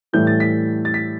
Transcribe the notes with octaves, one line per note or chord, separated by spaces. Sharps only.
A2 E3 G3 G6
A6
B6
A6
B6